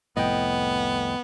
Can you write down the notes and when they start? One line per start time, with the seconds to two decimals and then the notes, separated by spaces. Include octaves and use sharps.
0.17 C2 F2 A2 B3 D#5 G5